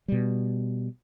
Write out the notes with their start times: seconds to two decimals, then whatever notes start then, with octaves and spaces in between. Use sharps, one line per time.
0.08 B2 G3